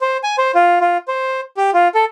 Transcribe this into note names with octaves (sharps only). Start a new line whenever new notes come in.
C5
G#5
C5
F4
F4
C5
G4
F4
A4